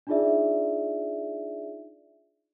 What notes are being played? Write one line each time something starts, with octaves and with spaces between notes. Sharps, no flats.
D4 D#4 F4 G#4 D5 E5